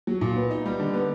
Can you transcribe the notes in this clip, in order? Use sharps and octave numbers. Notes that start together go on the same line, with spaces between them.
F#3
A#2
B3
D#4
G3
D3
B3